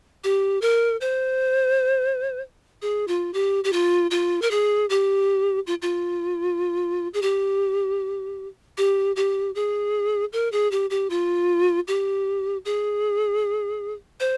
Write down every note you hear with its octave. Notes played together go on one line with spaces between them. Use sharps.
G4
A#4
C5
G#4
F4
G4
G4
F4
F4
A#4
G#4
G4
F4
F4
G#4
G4
G4
G4
G#4
A#4
G#4
G4
G4
F4
G4
G#4
C5